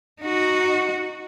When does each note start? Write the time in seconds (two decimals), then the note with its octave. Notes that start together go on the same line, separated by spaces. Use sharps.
0.22 D#4 F#4